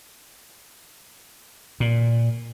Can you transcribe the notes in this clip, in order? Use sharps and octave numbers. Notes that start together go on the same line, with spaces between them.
A#2